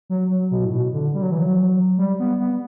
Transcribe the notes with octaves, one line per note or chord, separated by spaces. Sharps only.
F#3
F#3
B2
A2
B2
D3
G3
F#3
E3
F#3
G3
B3
B3